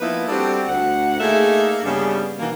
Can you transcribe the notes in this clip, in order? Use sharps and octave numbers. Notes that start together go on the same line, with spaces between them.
F3 A#3 B3 D#4 E4 B4
G3 C4 D4 F#4 G4 A4
D2 F#5
A3 A#3 D#4 E4 G#4 E5
G2 C#3 G3 B3 C#4 D4
B2 D#3 E3 A#3